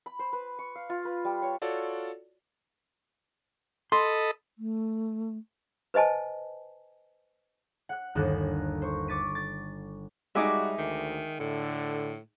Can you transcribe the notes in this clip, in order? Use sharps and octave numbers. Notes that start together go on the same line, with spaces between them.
B5
C5
B4
C#6
F5
F4
B4
G3
C#5
F4 F#4 A4 C#5 D5
A4 D#5 B5 C6
A3
B4 C5 D#5 G#5 A5
F#5 F#6
G1 D#2 A4 F#6
C5 C#6
C#6 D6 A6 B6 D#7
A6
G3 G#3 D#4 F#4 E5 G#5 D6
D2 D#3
A2 D3